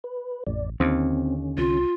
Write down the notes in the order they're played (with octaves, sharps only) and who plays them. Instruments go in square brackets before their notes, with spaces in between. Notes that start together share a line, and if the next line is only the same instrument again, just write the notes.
[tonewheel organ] B4
[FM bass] A1 [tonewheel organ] F2 D5
[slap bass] D#2 [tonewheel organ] D3 C#4 [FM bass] C4
[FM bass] C2 [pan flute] F4